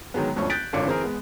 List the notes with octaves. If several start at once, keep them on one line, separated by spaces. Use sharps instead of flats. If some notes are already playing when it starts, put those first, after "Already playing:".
D#3 F#3 G#3 B3
G1 D2 F3 C#4 C#6
F#6 G6 A6 B6 D7
G#1 D3 C#4 F4 D6 C#7
E3 C4 G#4 A#4
G#3 B3